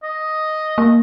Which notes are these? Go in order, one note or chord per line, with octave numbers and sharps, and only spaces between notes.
D#5
A#3